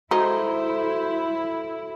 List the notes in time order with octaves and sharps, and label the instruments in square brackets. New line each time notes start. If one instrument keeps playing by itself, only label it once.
[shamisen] G#3 D#4 [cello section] E4 [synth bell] F#4 A4 [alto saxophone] C5